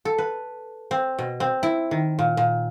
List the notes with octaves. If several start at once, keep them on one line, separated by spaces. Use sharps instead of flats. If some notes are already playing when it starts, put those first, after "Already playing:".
A4
B4
C4
B2
C4
E4
D#3
A#2
A#2